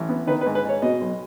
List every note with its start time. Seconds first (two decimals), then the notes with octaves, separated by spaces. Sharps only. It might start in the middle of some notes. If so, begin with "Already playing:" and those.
Already playing: A1
0.09 B3
0.27 D#3 B4
0.41 B4
0.46 G#2
0.55 B4
0.65 G#2 C#5
0.82 B2 D#5
1.01 B1